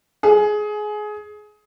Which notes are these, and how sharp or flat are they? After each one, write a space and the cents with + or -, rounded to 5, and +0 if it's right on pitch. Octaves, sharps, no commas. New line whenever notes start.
G#4 +20